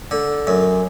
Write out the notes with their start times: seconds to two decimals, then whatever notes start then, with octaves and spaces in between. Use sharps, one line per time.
0.11 D3
0.47 F#2